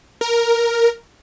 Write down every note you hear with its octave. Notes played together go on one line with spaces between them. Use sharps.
A#4